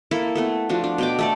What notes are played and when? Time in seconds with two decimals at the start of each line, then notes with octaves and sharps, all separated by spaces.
0.11 A#3 E4 A4
0.35 A3 B3 A4
0.69 F3 D4 F#4
0.84 D4
0.98 B2 G5 D6
1.19 A3 A4 D5